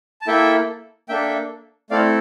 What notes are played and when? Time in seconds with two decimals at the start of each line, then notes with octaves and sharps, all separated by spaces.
0.21 A5
0.27 A#3 E4 A4 E5 G5
1.09 A#3 D4 A4 E5 G5
1.90 A3 C4 E4 A4 D5 F5